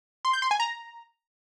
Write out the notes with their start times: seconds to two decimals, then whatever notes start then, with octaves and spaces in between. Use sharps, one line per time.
0.25 C6
0.33 G6
0.42 C6
0.51 G#5
0.60 A#5